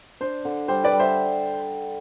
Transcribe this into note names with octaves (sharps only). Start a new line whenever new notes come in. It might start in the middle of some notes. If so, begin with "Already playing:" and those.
D4 C5
D3
G3 C5
B4 D5
G3
C5 E5